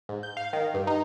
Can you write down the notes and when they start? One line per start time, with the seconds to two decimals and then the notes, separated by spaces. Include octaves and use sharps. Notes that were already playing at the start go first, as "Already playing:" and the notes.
0.09 G#2
0.23 G6
0.37 F5
0.53 D#3
0.74 G2
0.87 D#4